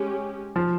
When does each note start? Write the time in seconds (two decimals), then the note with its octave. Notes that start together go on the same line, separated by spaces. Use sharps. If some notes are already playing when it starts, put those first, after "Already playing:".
Already playing: G#3 C#4 G4
0.56 F3